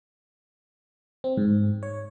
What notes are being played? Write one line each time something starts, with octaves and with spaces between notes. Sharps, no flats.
C4
G#2
C#5